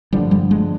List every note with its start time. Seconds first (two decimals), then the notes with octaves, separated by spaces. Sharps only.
0.12 G2 D3 F3 G3
0.31 G3
0.51 G#3